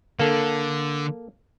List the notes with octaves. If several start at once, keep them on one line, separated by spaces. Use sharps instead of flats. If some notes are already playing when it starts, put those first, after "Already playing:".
D3 A#3 A4